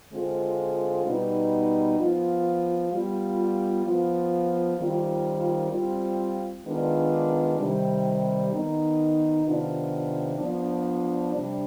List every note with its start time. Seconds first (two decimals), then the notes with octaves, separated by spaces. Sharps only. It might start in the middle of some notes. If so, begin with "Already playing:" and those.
0.12 D3 G#3 C4 F4
1.05 B2 G3 B3 D#4
1.98 F3 B3 F4
2.91 G3 B3 F4
3.86 F3 B3 F4
4.78 D#3 G3 C4 F4
5.72 G3 C4 F4
6.65 D#3 G#3 B3 D4 F4
7.59 C3 D#3 G3
8.53 D#3 B3 D#4
9.45 C3 D#3 B3 D4 F4
10.38 F3 B3 D4
11.32 C3 G3 D4